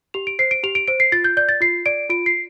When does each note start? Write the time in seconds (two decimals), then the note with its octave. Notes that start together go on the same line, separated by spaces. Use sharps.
0.14 G4 F7
0.27 D7
0.39 C5 C7
0.51 D7
0.63 G4 F7
0.75 D7
0.88 C5 D7
1.00 C7
1.12 F4 A6
1.24 G6
1.37 D5 G6
1.49 A6
1.61 F4 C7
1.86 D5 D7
2.10 F4 D7
2.26 C7